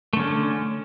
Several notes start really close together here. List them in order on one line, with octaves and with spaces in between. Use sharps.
A3 D3 C#4